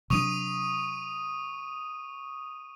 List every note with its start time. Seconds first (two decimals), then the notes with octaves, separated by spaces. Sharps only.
0.10 C3 F#3 D4 C#6 D#6 D#7